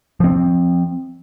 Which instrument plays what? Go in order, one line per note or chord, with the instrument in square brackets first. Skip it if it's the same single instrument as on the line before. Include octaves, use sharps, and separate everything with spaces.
[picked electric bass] F3 C4